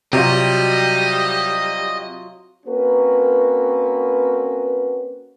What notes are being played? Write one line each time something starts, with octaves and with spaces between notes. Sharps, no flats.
C3 F#3 G3 F4 D#5
A#3 C4 C#4 F#4 A#4 B4